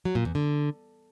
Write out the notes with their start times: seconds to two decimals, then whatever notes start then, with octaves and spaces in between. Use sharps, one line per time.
0.05 F#3
0.15 A#2
0.25 E2
0.35 D3